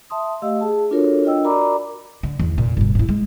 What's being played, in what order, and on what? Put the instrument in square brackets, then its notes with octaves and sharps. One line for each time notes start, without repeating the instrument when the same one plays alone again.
[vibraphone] E5 A5 C6 D#6
A3 G4 D#5 F5 E6
G#4 A5
D4 F4 F#4 A4 A#4 C#5
D4 F4 D#5 G5 E6
F#4 A#4 D5 A#5 B5 D6
[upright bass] D3
E2 D#3
F1 A#2
G1 B2
G#2 E4
G#3